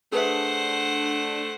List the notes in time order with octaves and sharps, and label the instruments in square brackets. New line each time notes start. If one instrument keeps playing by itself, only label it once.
[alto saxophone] A3 [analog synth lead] D4 [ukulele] G#4 B4 E5 [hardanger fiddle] C5 F#5